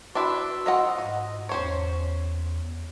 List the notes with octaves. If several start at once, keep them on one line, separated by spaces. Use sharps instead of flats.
D4 E4 F#4 B4 C6 E6
F4 D#5 F#5
G#2 D#5
E2 C#4 C5 C#5